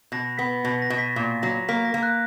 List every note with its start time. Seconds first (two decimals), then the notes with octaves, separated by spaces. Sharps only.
0.12 B2 A#6
0.38 B3 B6
0.65 B2 A#6
0.82 A#6
0.90 B2
0.98 B6
1.16 A#2
1.43 F#3 A#6
1.68 A#3 B6
1.85 A#6
1.94 A#3
2.03 F#6